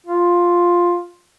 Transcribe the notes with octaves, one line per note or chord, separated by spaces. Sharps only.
F4